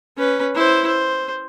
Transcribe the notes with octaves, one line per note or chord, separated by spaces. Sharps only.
C#4 B4
E4 C5
C5